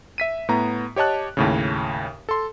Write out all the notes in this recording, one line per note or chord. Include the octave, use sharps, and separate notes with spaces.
E5 B6 D#7
A2 B3 A#5
G4 C#5 D#5 A5 F#6
D#2 A2 C#3
A4 C6